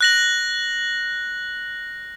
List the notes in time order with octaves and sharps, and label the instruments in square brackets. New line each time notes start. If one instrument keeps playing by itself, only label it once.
[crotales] F#6 A#6 F#7